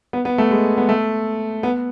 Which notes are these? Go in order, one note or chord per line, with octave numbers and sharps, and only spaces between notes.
B3
B3
A3
G#3
B3
A3
B3